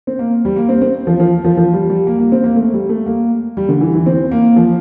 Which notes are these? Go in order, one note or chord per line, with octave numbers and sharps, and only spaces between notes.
C4
A#3
G3
A#3
C4
C4
F3
F3
F3
F3
G3
G3
A#3
A#3
C4
A#3
A3
G3
A3
A#3
G3
D3
E3
E3
C4
A#3
F3